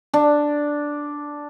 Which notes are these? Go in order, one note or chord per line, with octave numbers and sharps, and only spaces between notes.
D4